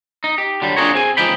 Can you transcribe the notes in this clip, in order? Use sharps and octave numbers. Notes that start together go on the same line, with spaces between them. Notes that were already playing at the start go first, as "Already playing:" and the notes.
D#4
G4
D3 F#3 G3
D4 F4 F#4 G#4 A#4 C#5
C4 G#4 G#5
C#2 F3 D#4 G5 B5